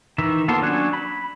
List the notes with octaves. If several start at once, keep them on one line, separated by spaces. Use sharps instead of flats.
D#3 E3 E5
A#3 B3 F4 A4 C5
F#3 C#4 D4 G#5 F#6
B5